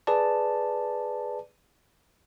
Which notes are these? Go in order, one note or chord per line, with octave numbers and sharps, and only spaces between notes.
G#4 B4 D5 A5